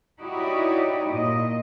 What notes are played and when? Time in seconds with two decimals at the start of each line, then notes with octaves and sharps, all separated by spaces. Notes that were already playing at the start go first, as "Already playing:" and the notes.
0.20 D#4 E4 F#4 G4 C#5 D5
1.10 A#2 D#5